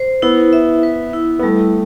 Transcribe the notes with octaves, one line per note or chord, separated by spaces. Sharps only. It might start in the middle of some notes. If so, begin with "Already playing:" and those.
Already playing: C5
B3 E4
E5
B4
E4
B3
G3 A3